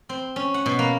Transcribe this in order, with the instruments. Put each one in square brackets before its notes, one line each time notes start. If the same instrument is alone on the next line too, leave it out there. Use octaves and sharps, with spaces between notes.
[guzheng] C4
C#4
F#5
B2
A#3